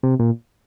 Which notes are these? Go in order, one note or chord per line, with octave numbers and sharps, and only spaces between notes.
C3
A#2